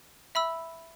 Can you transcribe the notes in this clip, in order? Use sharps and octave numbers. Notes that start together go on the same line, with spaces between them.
E5 B5 E6